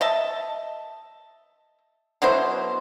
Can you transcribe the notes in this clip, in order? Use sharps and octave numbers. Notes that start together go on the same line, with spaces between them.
D#5 E5 A5
B2 F#3 E4 C5